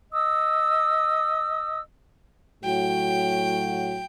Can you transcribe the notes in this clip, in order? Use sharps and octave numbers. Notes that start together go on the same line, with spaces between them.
D#5 D#6 E6
A2 F#3 F#4 G5